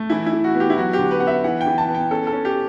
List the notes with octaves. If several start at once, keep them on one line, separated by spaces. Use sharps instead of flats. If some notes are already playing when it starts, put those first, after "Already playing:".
Already playing: A3
E3 E4
E4
E3
F#4
B3
G4
E4
F#3 F#4
G4
D3
B4
B3 F#5
E5
E3 F#5
G5
E3
A5
B3
G5
C#4 A4
A4
C#4
G4